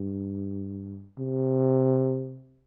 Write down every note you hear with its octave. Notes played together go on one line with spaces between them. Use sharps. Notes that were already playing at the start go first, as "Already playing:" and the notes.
Already playing: G2
C3